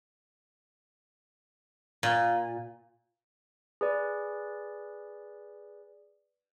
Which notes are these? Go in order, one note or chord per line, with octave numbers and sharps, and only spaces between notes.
A#2
G#4 B4 D5